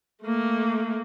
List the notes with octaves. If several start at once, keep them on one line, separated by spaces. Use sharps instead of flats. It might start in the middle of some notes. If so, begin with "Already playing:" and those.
A3 A#3